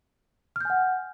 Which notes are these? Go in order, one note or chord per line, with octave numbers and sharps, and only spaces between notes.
F#5 G#5 F6 G6